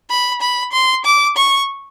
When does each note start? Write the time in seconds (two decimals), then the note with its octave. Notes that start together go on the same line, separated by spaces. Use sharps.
0.10 B5
0.41 B5
0.72 C6
1.05 D6
1.37 C#6